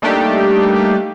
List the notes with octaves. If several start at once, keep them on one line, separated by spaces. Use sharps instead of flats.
G3 A3 A#3 D4 D#4 G4